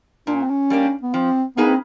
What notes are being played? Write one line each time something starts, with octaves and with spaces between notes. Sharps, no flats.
A#2 D4
C#4
C4
C#4
G3 A#3 D4
B3
F3 C4
A#3 B3 D#4 G#4 B4
C4